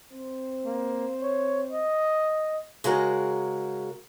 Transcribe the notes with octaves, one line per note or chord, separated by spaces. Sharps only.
C4 C5
A#3
C#5
D#5
C#3 G#3 F#4 A#4